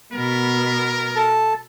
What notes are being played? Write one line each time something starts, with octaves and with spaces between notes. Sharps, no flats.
B2 B3 A#4
A4 A5